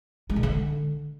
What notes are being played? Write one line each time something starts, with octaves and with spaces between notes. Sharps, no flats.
G#3
A#2
D3